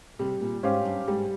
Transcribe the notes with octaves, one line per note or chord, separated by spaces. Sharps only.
C3 G3
A#2
G#2 C#4 G4 C5 F5
G2
G#2 G3